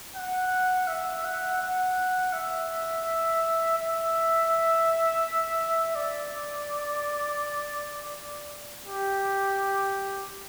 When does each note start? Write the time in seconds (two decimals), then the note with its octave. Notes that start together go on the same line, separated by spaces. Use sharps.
0.16 F#5
0.88 E5
1.25 F#5
1.61 F#5
2.33 E5
3.78 E5
5.95 D5
8.84 G4